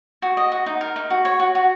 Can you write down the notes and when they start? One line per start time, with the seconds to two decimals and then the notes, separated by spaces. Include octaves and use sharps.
0.22 F#4
0.37 D#5
0.52 F#4
0.66 D#4
0.81 A#4
0.96 D#4
1.10 F#4
1.25 C#5
1.40 F#4
1.55 F#4